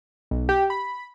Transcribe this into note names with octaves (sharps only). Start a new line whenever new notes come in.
B1
G4
B5